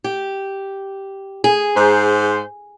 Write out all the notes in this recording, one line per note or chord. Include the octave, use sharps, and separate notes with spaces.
G4
G#4
G#2 C5